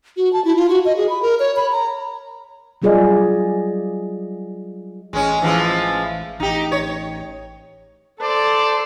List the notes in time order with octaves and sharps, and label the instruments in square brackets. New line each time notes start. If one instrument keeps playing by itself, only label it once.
[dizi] F#4
A5
E4
F4
F#4
D#5
G#4
B5
A#4
C#5
B5
A#5
[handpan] F#3 G3 F4 G#4 D5 D#5
[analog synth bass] A1 [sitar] G#3 C#4
[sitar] E3 F3 G#3
[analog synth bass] A1 [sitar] D#4 G4
[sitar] C#5
[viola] A4 C5 [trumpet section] D5 A5